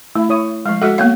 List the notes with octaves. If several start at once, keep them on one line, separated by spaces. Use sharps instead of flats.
A3 E4
E4 C#5 D#6
F3 G#3 F5
G#3 F#4 A4 E5 F#5
A#3 B3 C#5 F5 F#5